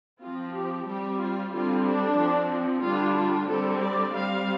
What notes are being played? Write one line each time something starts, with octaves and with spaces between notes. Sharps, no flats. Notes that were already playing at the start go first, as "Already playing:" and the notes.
F3 C4 F4
G4
G3 C4 G4
F4
D3 G3 C4 F4
D4
F3 C4
D3 G3 D4 F4
F4
D3 G3 C4 A4
D5
G3 C4 F5